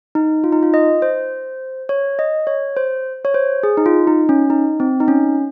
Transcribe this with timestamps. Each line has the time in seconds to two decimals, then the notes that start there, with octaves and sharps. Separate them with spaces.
0.15 D#4
0.44 F4
0.52 D#4
0.63 F4
0.74 D#5
1.02 C5
1.89 C#5
2.19 D#5
2.47 C#5
2.77 C5
3.25 C#5
3.34 C5
3.63 G#4
3.77 D#4
3.86 F4
4.07 D#4
4.29 C#4
4.50 D#4
4.80 C4
5.00 D#4
5.08 C#4